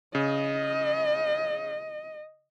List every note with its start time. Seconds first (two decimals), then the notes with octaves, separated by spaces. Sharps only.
0.15 C#3 D#5